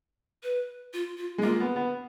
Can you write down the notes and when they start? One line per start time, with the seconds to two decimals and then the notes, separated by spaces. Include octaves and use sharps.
0.43 B4
0.93 F4
1.18 F4
1.38 G#3
1.42 A#3 F4
1.60 B3
1.76 B3